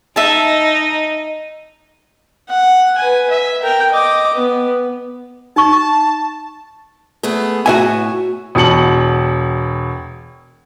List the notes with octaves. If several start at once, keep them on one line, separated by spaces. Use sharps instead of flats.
D#4 E5 A5
F#5
B4 G#5
E5
A#4 G5
D#5 D6
B3
D#4 A5 C#6
A3 B3 G#4
A2 F#4 E5 G#5
E1 B2 A5 C#7 F#7